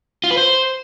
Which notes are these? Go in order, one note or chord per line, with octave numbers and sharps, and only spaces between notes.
F4
B4
C5